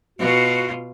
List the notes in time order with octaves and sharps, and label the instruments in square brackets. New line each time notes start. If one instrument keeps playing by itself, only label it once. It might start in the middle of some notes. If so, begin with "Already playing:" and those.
[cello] B2 F4 [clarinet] F#4